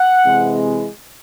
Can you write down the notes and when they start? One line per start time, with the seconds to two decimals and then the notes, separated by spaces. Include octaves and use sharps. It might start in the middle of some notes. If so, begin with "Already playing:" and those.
Already playing: F#5
0.26 C3 E3 G#3